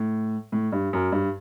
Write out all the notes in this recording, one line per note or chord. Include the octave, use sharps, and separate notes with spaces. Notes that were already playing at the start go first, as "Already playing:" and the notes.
Already playing: A2
A2
G2
F#2
G2